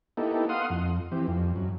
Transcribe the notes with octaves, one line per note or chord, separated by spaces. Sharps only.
A#3 B3 D#4 E4 G4 A4
F5 F#5 C6 D#6
F2
E3 C4 G4
F2
F#2